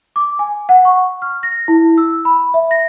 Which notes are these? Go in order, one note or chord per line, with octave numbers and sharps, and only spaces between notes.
D6
G#5
F#5
C#6
F6
A#6
E4
E6
B5
E5
A#6